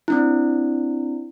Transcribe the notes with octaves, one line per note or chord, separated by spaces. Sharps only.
C4 D4 E4